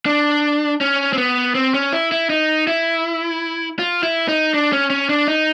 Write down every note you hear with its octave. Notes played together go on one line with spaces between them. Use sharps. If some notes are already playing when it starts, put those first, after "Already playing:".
D4
C#4
C4
B3
C4
C#4
E4
E4
D#4
E4
F4
E4
D#4
D4
C#4
C#4
D4
D#4